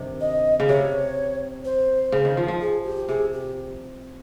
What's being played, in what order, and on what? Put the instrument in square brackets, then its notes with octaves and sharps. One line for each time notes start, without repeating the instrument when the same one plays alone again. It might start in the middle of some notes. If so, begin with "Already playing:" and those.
Already playing: [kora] G2 C3 D#3
[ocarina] D#5
[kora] C#3
[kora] C3 [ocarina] C#5
[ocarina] C5
[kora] C#3
D#3
F3
F3
[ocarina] G#4
G4
[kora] C3 [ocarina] G#4
[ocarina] G4